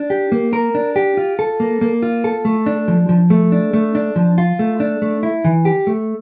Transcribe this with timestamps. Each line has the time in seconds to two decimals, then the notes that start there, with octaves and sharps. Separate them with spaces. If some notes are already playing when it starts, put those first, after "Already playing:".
Already playing: D4
0.10 G4
0.32 A#3
0.53 A#4
0.75 D4
0.96 G4
1.17 F4
1.39 A4
1.60 A#3
1.81 A#3
2.02 F4
2.24 A4
2.45 A3
2.66 D4
2.88 F3
3.09 F3
3.30 A3
3.52 D4
3.73 A3
3.95 D4
4.16 F3
4.38 F4
4.59 A3
4.80 D4
5.02 A3
5.23 E4
5.45 E3
5.65 G4
5.87 A3